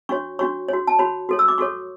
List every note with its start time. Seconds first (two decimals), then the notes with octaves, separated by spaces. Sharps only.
0.09 D4 F#4 C#5 C#6
0.39 D4 F#4 C#5 C#6
0.69 F#4 C#5
0.87 A5
0.99 F#4 C#5 B5
1.29 F#4 A4 C#5
1.39 E6
1.48 D6
1.58 F#4 A4 C#5 C#6